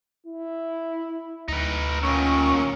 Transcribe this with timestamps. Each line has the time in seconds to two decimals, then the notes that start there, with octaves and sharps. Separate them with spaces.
0.26 E4
1.48 D2 D#4 B4
2.03 D#2 A#2 C#4 C#6